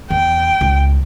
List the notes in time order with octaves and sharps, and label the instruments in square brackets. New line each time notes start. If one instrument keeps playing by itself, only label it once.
[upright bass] E2 [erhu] G5
[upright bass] C#2